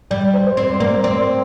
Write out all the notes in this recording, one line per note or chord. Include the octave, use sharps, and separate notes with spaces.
G3 D5
C5
C5
C4 D5
D5
A#3 C5
C4 D5